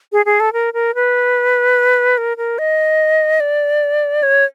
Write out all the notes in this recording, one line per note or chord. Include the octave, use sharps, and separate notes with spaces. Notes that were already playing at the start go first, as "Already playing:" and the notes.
G#4
G#4
A4
A#4
A#4
B4
A#4
A#4
D#5
D5
C#5